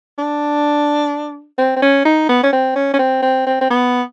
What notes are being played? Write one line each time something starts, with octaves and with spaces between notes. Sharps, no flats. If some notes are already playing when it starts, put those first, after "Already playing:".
D4
C4
C4
C#4
D#4
B3
C#4
C4
C#4
C#4
C4
C4
C4
C4
B3